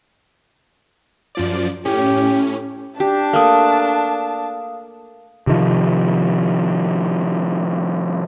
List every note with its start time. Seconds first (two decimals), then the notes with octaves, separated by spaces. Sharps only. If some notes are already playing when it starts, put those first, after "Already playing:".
1.35 F#2 F3 D5
1.85 A2 C#4 G4
3.00 D4 G4 A5
3.33 A3 A#3 F5 D#6
5.47 C3 D#3 F3